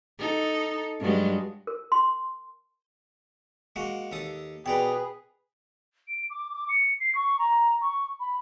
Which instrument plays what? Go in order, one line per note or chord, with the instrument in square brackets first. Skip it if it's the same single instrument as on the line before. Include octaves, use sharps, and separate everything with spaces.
[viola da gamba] D#4 A4
G2 F#3 G#3
[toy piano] A#4
C6
[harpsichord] G#3 A#3 F#4
D#2 A4 D#6
[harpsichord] B2 D5 A#5 [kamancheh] G#4 B4 [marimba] G5
[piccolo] D7
D6
D6
C#7
C7
C#6
A#5
C#6
B5